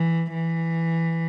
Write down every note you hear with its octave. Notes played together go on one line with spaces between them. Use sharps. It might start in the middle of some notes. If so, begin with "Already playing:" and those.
Already playing: E3
E3